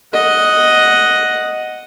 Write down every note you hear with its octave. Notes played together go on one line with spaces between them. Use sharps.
D#5 F#5